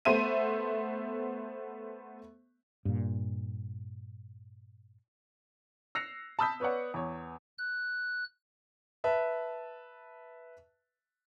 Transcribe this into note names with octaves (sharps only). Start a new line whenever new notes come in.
A3 B3 C5 E5 D#7
G2 A#2
E6 F#6 A#6 C7 C#7 F7
A5 B5 D#6 E6 G6 B6
B3 B4 C#5 D5 F#5
E2 C#5
F#6
B4 E5 A5